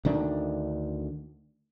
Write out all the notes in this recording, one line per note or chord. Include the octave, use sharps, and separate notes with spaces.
D2 D#3 D4